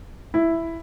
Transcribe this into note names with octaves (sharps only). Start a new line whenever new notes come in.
E4